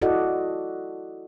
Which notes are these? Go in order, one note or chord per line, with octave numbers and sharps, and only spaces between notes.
E4 F#4 A4 D5 D#5 F#5